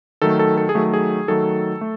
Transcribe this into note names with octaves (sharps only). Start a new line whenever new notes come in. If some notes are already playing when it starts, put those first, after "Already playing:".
D#3 F#3 A3 A4
A4
A4
G#4
D#3 F#3 A3
G#4
D#3 F#3 A3 A4
A3